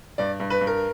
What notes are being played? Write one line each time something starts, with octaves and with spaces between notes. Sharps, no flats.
G2 D5
G2
B4
G2
A#4